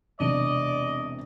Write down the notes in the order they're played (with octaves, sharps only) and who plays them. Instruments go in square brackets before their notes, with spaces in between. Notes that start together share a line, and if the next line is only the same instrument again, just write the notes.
[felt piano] E1 C3 D4 [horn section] D5 D#5